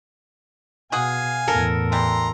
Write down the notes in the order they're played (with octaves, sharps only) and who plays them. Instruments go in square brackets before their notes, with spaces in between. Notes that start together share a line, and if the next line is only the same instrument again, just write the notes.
[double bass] B2 [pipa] F#4 G#4 [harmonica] F5 G#5
[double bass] E2 A2 [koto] A4 A#4
[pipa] E3 G3 [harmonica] A#5 C6